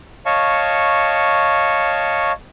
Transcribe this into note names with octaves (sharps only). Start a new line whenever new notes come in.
C#5 D#5 F5 A5 C#6